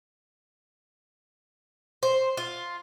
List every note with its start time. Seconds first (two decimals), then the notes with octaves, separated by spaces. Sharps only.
2.03 C5
2.37 F4